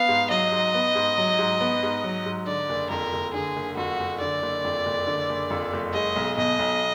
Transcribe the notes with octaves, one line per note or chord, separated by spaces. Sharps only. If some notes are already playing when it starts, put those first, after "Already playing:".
Already playing: B3 F5
G#2
F#3 D#5
G#2
B3
G#2
F#3
G#2
B3
G#2
F#3
G#2
D3 D5
F#1
F2 A#4
F#1
D3 G#4
F#1
F2 F#4
F#1
D3 D5
F#1
F2
F#1
D3
F#1
F2
F#1
G#3 D#5
B1
B2 D#5
B1